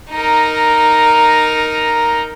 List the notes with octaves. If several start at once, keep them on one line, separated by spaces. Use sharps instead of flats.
D#4 A#4